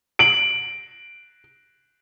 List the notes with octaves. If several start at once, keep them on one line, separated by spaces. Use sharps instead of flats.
D7 F#7